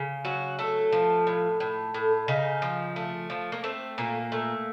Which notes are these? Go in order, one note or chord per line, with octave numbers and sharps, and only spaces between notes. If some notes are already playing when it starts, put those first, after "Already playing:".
Already playing: C#3
F#3 F#4
A3 A4
F3
A2
A2
A2
C#3 D#4
F3
A3
F3
A#3
A3 C4
A#2 A#3
A3